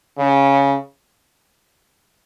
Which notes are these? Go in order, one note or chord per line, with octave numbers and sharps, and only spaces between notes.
C#3